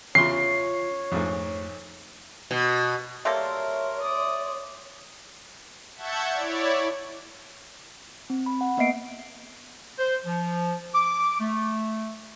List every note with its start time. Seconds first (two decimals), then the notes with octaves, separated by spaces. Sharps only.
0.15 E2 C#3 C#4 F4 C#5 C6 C7
1.12 A#1 F2 G#2 A3
2.51 B2
3.25 G3 A#3 A4 A#4 C#5 E5 C6
4.01 D5 D#6
5.96 E5 F#5 A5 C#6 G6 G#6
6.32 E4 C#5 D5
8.30 C4
8.46 B5
8.61 F#5
8.77 A#3 B3 D#5 E5 C7 D7
9.99 C5
10.26 F3
10.95 D6
11.40 A3